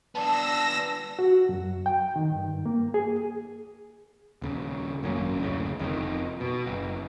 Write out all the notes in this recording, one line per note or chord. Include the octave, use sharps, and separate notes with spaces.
B3 D4 A5 E6 A#6
F#4
F#2
G5
D#3
G2
A#3
G#4
D#1 C#3
G#1 F#2 A#3 C#4
F#1 D2 A2 C#3
F1 F2 G#2 D#3
B2
F#1